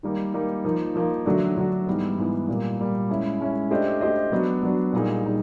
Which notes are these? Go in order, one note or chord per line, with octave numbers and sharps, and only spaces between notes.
D#3 G3 A#3 D#4
D#3 G3 A#3 D#4
F3 A#3 D#4
F3 A#3 D#4
D3 F#3 A3 D4 F#4
D3 F#3 A3 D4 F#4
G#2 E3 G3 B3
G#2 E3 G3 B3
A#2 G3 A#3
A#2 G3 A#3
G#3 C#4 E4
G#3 C#4 E4
A3 D4 G4 C5 D#5
A3 D4 G4 C5 D#5
F#3 B3 D4 F#4
F#3 B3 D4 F#4
A#2 G3 A#3 D#4 G#4
A#2 G3 A#3 D#4 G#4